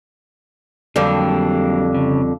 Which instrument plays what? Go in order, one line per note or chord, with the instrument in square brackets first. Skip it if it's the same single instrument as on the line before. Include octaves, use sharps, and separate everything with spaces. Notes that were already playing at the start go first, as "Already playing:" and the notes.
[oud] F2 D3 G3 [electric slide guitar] F#3 A#3 D4
[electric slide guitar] C#3